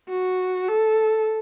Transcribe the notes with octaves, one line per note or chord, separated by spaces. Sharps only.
F#4
A4